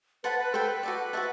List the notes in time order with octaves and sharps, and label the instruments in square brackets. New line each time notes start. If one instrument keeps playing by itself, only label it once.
[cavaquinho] A4 C5 F#5 A5 [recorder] B4
[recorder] B4
[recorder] A4 [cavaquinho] C5 G5 B5
[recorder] B4
[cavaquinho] F#4 A4 D5
F#4 C5 E5 A5